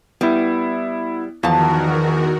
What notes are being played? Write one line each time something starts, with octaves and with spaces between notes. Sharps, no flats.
G3 B3 E4
E2 D#3 F3 F#4 A#4 A5